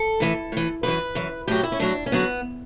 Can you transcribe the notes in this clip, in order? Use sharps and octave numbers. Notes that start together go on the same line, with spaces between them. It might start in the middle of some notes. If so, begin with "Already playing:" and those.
Already playing: A4
A2 E3
A2 E3
F#2 E3 B4
F#2 E3
A2 F#3 G4
E4
C#4
A2 F#3 D4
C#4
D3 F#3 B3